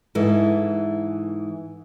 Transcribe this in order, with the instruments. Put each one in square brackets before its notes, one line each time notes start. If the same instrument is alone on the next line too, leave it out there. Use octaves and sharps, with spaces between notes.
[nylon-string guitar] G#2 E3 A4